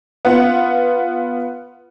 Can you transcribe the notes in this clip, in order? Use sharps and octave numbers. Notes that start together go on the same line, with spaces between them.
B3 F4 F#5